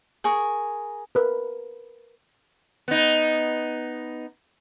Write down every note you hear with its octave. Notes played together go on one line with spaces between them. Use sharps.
G#4 A#4 C#6
A#4 B4
B3 D#4